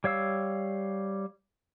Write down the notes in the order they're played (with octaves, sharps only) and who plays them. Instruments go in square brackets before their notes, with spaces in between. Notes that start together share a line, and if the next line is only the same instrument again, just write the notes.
[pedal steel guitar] G3 C#5 F5 E6